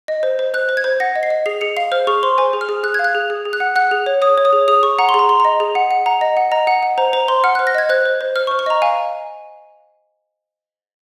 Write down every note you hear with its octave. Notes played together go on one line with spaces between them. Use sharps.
D#5
C5
C5
C5 F#6
C5
G#6
C5
F#5 A#6
D#5
C7
D#5
G#4 C7
G#4 C#7
F5 C7
C5 F6
G#4 C#6
C5 C6
C5 G#5
G#4
F6
G#4
G#4 F#6
F5 G#6
F#6
G#4
G#4
G#4
F#6
F#5
F#5 F#6
G#4
C#5
C#5 D#6
C#5
D#6
G#4
G#4 D#6
G#4 C#6
F#5 A#5
C6
G#4
A#5
G#4 C6
D#5 A#5
G#4
F#5
F#5
F#5 A#5
D#5
F#5
D#5 A#5
F#5
F#5
C5 A#5
C5 A#5
C5 C6
F#5 F6
C5 F#6
A#6
D#5 G#6
C5 F#6
C5
C5
C5 F6
C#6
C5
C#6
D#5 A#5
F5 G#5